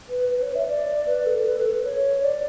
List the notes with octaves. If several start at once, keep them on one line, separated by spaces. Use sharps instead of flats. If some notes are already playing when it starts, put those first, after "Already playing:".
B4
B4
C#5
E5
D5
B4
A4
B4
A4
B4
C#5
D5